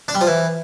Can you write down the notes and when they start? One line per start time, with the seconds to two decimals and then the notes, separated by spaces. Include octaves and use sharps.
0.08 D4
0.15 G3
0.21 F3
0.27 E3